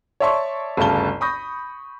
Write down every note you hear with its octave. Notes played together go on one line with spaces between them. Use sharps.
C#5 D5 E5 A5 C6 C#6
G1 D2 C#3 A5 G7
B5 C#6 D#6 G6 A#6